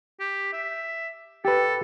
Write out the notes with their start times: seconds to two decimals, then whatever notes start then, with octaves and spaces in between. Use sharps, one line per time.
0.20 G4
0.53 E5
1.45 G4 A4 B4